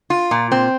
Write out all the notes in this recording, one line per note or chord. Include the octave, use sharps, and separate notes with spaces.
F4
A#2
C4